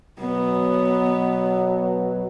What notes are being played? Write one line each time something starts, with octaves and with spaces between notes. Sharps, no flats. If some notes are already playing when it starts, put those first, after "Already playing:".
B2 F#3 B3